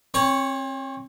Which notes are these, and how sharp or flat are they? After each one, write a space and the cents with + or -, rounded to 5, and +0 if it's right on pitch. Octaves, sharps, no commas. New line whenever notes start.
C4 +35 C#5 +0 C#6 +0